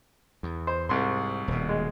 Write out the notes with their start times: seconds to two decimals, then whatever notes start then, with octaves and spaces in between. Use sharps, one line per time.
0.43 E2
0.67 C5
0.89 C2 G#2 C6
1.48 D#1 B2
1.69 G#3